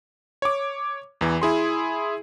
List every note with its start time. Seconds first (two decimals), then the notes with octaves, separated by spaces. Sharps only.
0.42 C#5 D6
1.21 E2 E3
1.42 E4 G#4 C6